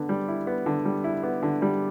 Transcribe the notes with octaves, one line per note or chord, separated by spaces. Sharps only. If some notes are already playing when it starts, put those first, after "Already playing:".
Already playing: D3 B3
G3
E4
B3
D3
G3
E4
B3
D3
G3